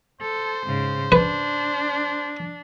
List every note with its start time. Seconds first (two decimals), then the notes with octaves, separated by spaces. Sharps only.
0.21 A4 C5
0.65 G#2 C#3
1.12 D4 B4